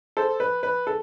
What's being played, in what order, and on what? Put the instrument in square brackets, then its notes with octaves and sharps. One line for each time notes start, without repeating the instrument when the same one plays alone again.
[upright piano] A4 C5
B4
B4
A4